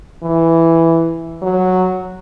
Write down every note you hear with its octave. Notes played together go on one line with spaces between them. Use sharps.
E3
F#3